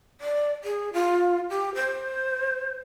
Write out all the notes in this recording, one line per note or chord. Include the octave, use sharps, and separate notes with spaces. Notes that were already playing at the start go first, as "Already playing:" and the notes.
D5
G#4
F4
G4
C5